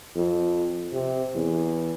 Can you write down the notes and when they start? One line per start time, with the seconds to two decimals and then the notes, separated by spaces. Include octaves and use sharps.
0.16 F2
0.93 C3
1.35 E2